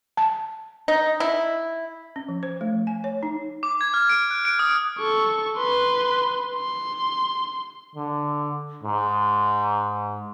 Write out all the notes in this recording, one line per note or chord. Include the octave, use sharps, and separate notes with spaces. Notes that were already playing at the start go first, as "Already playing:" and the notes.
A5
D#4
E4
C#4
F3
C5
A3
F3
G#5
C#5
D#4
D6
G#6
F6
D7
F#6
D7
D#6
A4 C#6
B4 C6
C6
D3
G#2